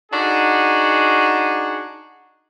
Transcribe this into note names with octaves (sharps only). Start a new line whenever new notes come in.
D4 D#4 F#4 G#4